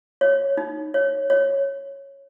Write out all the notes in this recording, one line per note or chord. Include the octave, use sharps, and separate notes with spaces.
C#5
D#4
C#5
C#5